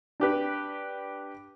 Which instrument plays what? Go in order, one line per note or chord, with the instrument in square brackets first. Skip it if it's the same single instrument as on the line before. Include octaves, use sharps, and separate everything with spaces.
[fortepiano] D4 G4 B4